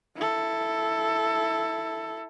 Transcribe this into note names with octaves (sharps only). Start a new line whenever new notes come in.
E4 A4